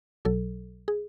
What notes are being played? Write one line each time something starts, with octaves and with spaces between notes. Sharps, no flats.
B1 B2 F#3 A4
G#4